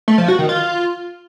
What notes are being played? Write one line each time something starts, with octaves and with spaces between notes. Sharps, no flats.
A3
F3
F#4
D#3
F4